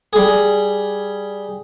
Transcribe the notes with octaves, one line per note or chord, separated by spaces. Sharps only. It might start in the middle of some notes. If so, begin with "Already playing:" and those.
G3 G#4